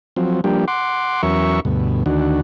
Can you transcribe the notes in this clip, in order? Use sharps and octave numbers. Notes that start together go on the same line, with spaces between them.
F3 F#3 C4
F3 G3 A#3 D4 G4
F#5 C6 D6
E2 F#3 C#4 A#4 E5 C#6
D2 G2 B2
D2 D#3 D4 F#4